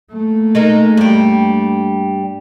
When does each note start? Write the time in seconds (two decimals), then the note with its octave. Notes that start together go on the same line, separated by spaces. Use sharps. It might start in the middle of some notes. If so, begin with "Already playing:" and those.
0.11 A3 A#3
0.55 G#3 D#4 A#4
0.97 G2 G3